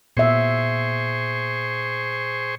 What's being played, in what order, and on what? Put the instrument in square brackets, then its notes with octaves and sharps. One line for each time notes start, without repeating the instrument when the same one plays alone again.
[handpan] A#2 B3 E5 [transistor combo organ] G#4 C5 C#6